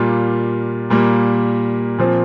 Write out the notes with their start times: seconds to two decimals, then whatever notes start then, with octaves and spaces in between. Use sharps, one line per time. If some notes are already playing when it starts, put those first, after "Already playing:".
Already playing: A#2 G3 A#3 F4
0.90 A#2 G3 A#3
1.98 A#2 F3 C4